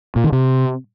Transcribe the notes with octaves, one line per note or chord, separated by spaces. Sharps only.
A#2
D#3
C3